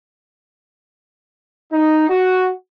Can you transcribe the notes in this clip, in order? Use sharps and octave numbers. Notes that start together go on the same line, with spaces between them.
D#4
F#4